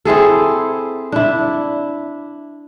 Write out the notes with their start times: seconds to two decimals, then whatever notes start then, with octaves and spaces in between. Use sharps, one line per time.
0.05 C4 E4 G#4 A4
1.12 D4 E4